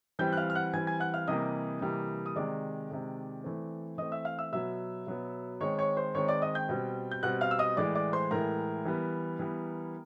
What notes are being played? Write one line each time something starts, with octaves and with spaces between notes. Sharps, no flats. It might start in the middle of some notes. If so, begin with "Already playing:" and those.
E3 G3 C4 G5 G6
F#6
F5 F6
F6
F#5 F#6
E3 G3 C4 G#5 G#6
G#5 G#6
F#5 F#6
F5 F6
C3 E3 G3 A#3 D#5 D#6
C3 E3 G3 A#3
D#6
C3 D#3 G#3 D5 D6
C3 D#3 G#3
E3 A3 C4
E3 A3 C4 D#5 D#6
E5 E6
F5 F6
E5 E6
B2 F#3 B3 E5 E6
B2 F#3 B3
D#3 G#3 C4 C#5 C#6
C#5 C#6
C5 C6
D#3 G#3 C4 C#5 C#6
D5 D6
D#5 D#6
G5 G6
B2 G3 C4
G6
B2 G3 C4 F#5 F#6
F5 F6
E6
D#5 D#6
A2 E3 G#3 D5 D6
D5 D6
C5 C6
A2 E3 G#3 A#4 A#5
E3 G3 B3
E3 G3 B3